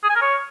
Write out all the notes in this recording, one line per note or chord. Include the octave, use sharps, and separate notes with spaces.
G#4
G#5
A#4
C#5